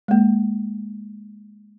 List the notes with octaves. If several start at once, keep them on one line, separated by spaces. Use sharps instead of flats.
G#3 A#3